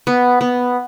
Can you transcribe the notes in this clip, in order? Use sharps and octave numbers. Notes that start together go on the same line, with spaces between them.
B3
B3